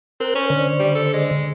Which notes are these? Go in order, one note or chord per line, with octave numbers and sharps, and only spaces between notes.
C4 A#4 F#6
C#4 C5
D3 C5 D5
G3
A4
G#3